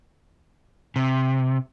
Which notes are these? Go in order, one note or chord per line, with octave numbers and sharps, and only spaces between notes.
C3